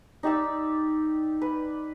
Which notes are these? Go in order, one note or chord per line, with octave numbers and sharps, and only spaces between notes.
D#4 G4 D5 E6
B4